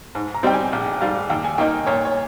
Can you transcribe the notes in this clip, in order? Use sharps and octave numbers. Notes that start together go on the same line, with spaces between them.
G#2
A#5
G3 C4 D#4 G5
G#5
A#1 G5
G#2 G3 F5
D#2 G5
G#5
D#3 A#3 D#4 G5
A#2 C#5
C#5